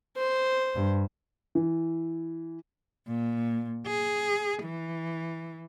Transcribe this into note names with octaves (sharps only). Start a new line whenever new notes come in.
C5
G2
E3
A#2
G#4
E3